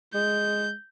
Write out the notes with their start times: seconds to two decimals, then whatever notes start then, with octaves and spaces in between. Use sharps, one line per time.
0.14 G#3 G6